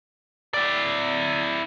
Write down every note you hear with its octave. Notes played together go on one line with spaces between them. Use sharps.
E4 D5